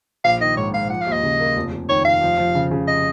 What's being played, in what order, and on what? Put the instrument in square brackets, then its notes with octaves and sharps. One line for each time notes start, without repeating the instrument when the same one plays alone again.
[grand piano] A#1 [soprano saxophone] F5
[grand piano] D#3 [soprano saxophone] D#5
[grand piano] G#2 [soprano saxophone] C#5
[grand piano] G#2 [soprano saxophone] F5
[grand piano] F3 [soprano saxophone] F#5
[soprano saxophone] F5
[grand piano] D#2
[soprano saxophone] D#5
[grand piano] C#3
A#3
F1
F1
[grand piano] D#3 [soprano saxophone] C#5
[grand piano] F1 [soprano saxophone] F5
[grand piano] F3
F3
C#3
C#3
[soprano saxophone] D#5